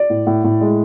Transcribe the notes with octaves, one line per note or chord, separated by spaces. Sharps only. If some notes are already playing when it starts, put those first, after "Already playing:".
Already playing: D5
A2
A2
A2
G#3